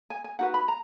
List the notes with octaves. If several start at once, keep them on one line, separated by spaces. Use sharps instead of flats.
G#5
G#5
D#4 F#4 B4 F#5
B5
A#5